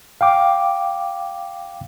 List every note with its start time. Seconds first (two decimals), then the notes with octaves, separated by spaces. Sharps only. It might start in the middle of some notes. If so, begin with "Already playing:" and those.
0.21 F5 G5 D6